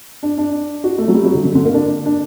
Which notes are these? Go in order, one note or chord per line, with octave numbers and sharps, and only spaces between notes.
D4
D4
F#4
A3
F#3
G3
F#3
D3
D3
D3
A#3
D4
D4